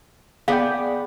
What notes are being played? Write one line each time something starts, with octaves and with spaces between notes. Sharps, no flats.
B3 G#4 D5 F5 G5